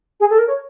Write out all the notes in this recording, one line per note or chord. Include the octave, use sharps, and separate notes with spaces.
G#4
A4
A#4
C#5